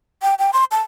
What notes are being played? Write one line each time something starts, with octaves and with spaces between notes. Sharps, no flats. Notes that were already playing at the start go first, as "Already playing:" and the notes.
G5
G5
C6
A5